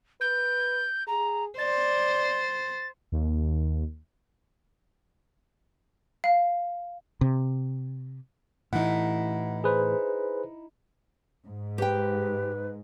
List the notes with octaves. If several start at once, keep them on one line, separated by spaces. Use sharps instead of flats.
B4 G6
G#4 A#5
C5 D5 A6
D#2
F5
C3
A2 E3 D#4 E4 F#5
G#4 B4 C5
G#2
G4 B4 G5